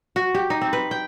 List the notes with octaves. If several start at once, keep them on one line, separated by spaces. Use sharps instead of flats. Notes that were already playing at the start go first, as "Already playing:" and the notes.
F#4
G4
D#4
C4
B4
G5